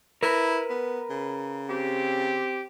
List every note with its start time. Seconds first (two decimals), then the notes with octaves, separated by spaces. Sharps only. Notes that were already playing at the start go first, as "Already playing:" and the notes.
0.23 E4 A#4 B4
0.70 B3
1.10 C#3
1.69 C4 G4